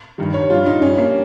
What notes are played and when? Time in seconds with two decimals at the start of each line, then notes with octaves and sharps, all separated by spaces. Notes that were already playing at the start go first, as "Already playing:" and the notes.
0.18 G2 D#3 G3
0.34 C#5
0.50 G2 G3 F4
0.66 D#4
0.82 G2 G3 C#4
0.98 A#3